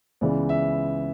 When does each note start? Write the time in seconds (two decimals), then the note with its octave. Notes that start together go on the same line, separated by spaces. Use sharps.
0.21 C#2 C#3 E3 G#3 B3 D5
0.49 E5